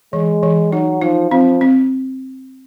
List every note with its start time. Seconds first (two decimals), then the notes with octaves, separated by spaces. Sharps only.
0.13 E3 G#3
0.43 E3
0.72 F#3 D#4
1.02 F3 D#4
1.31 F3 C4
1.61 C4